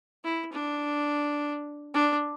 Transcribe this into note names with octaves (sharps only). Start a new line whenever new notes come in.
E4
D4
D4